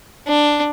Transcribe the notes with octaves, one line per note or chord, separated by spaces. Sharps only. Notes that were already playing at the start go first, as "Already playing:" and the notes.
D4